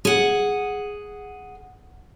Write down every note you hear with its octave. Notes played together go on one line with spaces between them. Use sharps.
G#4 F#5